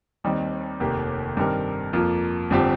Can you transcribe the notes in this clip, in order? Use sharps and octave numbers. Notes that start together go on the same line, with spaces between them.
D#2 D#3 G3 C4 D#4
F1 D#2 D#3 A#3 G4
G2 D#3 C4 G4 A#4
F2 F3 A#3 F4
G1 G2 F3 C4 G4